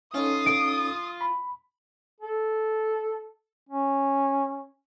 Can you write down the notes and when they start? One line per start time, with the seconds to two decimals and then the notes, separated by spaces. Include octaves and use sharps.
0.14 C#4 D#4 F4 A4 D#6
0.46 D7
1.21 B5
2.21 A4
3.69 C#4